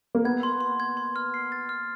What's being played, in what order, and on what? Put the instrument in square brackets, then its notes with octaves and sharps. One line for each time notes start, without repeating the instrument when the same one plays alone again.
[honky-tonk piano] A#3
[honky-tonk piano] B3 [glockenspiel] G#6
[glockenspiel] C6
C6
G#6
C6
F6
C7
A6
F6